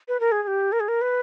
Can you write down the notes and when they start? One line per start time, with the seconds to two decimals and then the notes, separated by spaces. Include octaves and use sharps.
0.08 B4
0.20 A#4
0.32 G#4
0.43 G#4
0.47 G4
0.72 A#4
0.80 G#4
0.88 A#4
1.01 B4